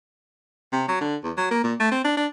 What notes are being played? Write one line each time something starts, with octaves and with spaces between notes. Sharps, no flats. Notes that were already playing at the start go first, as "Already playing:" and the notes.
C3
F#3
D3
E2
F#3
A#3
A#2
A3
C4
D4
D4